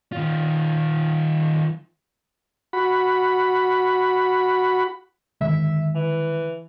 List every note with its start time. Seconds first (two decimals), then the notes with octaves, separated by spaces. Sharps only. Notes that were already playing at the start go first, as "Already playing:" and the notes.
0.12 D#3 F4
2.73 F#4 B5
5.41 D3 D#3 G#3 E5
5.95 E3